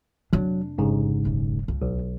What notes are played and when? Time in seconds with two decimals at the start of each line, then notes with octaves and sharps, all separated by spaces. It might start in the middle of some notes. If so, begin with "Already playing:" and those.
0.33 F1 F#3 D4
0.78 A1 G#2 C#3
1.25 E1 F#2
1.68 C#2
1.82 B1